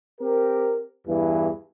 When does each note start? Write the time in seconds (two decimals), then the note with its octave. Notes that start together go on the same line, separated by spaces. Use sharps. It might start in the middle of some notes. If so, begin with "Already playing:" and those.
0.21 C4 G4 A#4
1.07 E2 G2 E3